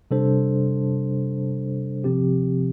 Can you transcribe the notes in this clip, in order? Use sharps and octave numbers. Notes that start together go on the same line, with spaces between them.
C3 G3 D4 A4 C5
C3 F3 C4 G4